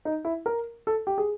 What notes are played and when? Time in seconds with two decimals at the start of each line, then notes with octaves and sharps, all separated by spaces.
0.05 D#4
0.25 E4
0.46 A#4
0.87 A4
1.07 G4
1.18 G#4